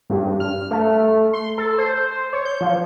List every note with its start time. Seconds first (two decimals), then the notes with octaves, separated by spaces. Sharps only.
0.10 G2
0.40 F6
0.71 A3
1.33 C6
1.58 A4
1.78 C5
2.33 C#5
2.45 G6
2.61 F3